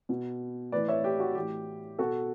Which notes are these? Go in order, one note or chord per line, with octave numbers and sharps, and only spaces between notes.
B2
A2 E3 B4 D5
C#5 E5
G4
F#4
A2 E3 G4
B2 F#4 A4